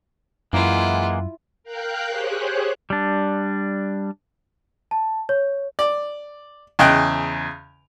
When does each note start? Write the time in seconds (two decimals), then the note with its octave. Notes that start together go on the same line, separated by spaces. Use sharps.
0.53 F#2 E3 G#3 A#3 E4 F4 F#5
1.64 A#4 F5 G5 F#6 G6
2.09 G4 G#4 C5 C#5 F#6
2.90 G3 D4
4.91 A5
5.29 C#5
5.79 D5
6.79 E2 C#3 D#5 G5 F#6